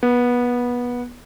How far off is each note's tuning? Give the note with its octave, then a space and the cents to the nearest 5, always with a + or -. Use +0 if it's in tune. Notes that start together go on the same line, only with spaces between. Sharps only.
B3 -20